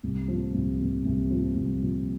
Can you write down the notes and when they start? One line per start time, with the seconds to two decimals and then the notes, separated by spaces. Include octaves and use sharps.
0.03 C2
0.28 A#2 F3
0.54 C2
0.79 A#2 F3
1.05 C2
1.30 A#2 F3
1.56 C2
1.81 A#2 F3